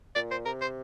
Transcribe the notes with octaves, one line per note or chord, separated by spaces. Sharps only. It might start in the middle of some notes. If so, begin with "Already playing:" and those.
A#2 D5
C5
C3 A#4
C5